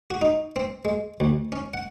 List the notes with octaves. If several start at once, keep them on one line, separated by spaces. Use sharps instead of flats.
F#4
D#4
C4
G#3
D2
C#4
F#5